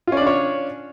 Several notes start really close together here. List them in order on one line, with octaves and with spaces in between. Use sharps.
F4 C#4 D5 D4 C#5